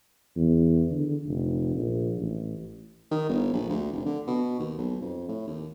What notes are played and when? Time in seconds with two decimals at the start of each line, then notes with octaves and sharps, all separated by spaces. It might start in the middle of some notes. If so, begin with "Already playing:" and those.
0.37 E2
0.91 D3
1.26 F1
1.75 A#1
2.17 A1
3.11 D#3
3.29 G1
3.53 A#1
3.69 D2
3.93 F1
4.06 D3
4.27 B2
4.59 D#2
4.79 B1
5.01 F2
5.28 A2
5.47 D#2